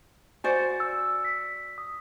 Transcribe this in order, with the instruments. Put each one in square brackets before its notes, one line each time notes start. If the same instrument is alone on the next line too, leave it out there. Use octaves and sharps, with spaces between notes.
[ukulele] F#4 C5 D5 [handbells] G#5 A6 C#7
[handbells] E6
B6
D#6